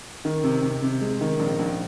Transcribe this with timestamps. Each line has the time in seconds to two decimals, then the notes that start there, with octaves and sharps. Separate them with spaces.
0.25 D#3
0.44 C3
0.63 C3
0.82 C3
1.01 G#3
1.21 D#3
1.39 A#1
1.59 A#1